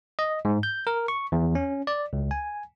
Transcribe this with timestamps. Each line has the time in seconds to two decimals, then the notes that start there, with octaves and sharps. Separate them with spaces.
0.19 D#5
0.45 G#2
0.63 G6
0.87 A#4
1.08 C#6
1.32 E2
1.55 C#4
1.87 D5
2.13 C#2
2.31 G#5